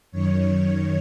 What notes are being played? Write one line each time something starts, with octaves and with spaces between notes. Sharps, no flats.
F#2 D#3 C#5